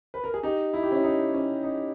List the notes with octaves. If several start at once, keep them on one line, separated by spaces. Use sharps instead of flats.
B4
A#4
G#4
D#4 G4
E4
G4
C#4 E4
D#4
C#4
D#4